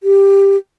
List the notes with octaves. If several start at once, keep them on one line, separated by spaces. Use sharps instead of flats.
G4